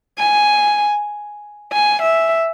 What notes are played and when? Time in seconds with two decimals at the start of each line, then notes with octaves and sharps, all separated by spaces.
0.19 G#5
1.73 G#5
2.02 E5